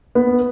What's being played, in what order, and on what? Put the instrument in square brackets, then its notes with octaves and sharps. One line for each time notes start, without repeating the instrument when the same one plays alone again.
[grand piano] B3